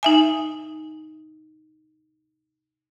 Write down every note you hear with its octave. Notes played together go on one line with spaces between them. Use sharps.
D#4 E5 G#5